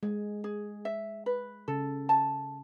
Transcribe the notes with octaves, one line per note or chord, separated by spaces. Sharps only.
G#3 G#4
G#4
E5
B4
C#3 A4
A5